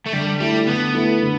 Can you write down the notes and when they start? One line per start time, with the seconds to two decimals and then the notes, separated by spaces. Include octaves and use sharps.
0.06 A3
0.13 D3 G3
0.40 G3 A3 E4
0.68 D3 B3
0.94 A3 E4
1.22 D3